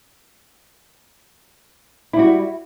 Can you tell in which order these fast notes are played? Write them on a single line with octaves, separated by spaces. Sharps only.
E4 G3 F#4